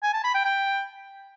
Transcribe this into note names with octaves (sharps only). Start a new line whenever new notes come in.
G#5
A5
B5
G5
G5